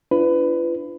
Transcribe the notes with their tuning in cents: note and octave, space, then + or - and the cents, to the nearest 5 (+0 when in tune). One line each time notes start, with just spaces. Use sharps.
D4 +0 F4 -40 B4 +20